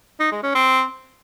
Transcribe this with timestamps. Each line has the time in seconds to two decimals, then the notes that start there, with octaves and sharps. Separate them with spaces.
0.20 D#4
0.32 G#3
0.43 C#4
0.55 C4